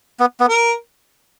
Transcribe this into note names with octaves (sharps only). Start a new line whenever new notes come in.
B3
B3
A#4